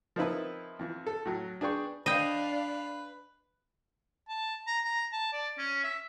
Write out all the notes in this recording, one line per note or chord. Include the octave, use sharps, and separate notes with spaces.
F3 A#3 C4 D#4 E4 B4
F2 E3
A4
A2 F#3
D4 G#4 B4 G5 C#6
D4 B4 D#5 F5 G5
A5
A#5
A#5
A5
D5
C#4
E5